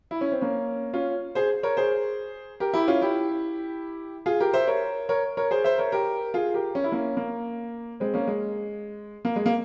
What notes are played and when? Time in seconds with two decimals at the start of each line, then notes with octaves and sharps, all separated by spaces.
0.11 E4
0.21 C#4
0.32 C4
0.41 A#3 C#4
0.93 C#4 F4
1.35 G#4 C5
1.63 A#4 C#5
1.77 G#4 C5
2.60 G4 A#4
2.73 E4 G4
2.88 C#4 F4
3.02 E4 G4
4.26 F4 G#4
4.40 G4 A#4
4.54 C5 E5
4.67 A#4 C#5
5.09 A#4 C#5
5.37 A#4 C#5
5.51 G#4 C5
5.64 C5 E5
5.78 A#4 C#5
5.92 G4 A#4
6.34 F4 G#4
6.54 G4 A#4
6.75 C#4
6.84 E4
6.92 A#3 C#4
7.17 A#3
8.00 G#3 C4
8.14 A#3 C#4
8.27 G#3
9.25 A#3
9.36 G#3
9.46 A#3